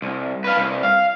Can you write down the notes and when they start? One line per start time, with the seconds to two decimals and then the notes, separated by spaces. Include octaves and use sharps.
0.02 C2
0.44 B4 F5
0.57 C2
0.83 F5